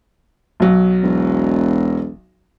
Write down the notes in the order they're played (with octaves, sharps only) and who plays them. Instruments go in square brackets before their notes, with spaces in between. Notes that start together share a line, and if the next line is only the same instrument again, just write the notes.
[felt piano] B1 F#3
[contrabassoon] E1